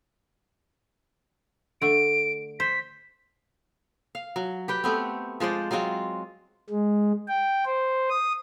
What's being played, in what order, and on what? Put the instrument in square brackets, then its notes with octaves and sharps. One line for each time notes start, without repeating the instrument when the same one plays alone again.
[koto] D3 A3 [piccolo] D7
[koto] C5 [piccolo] B6
[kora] F5
F#3
G4 B4 G5
A3 B3 C4
F3 G#3 C5 D5
F#3 G#3 C4 F4
[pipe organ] G#3
G5
C5
D#6